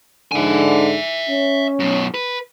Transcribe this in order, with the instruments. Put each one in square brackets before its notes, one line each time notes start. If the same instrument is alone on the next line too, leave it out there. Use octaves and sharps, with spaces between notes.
[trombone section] G#2 D3 [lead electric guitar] E5 G#5
[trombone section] C#4
[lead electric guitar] F#2 B2
B4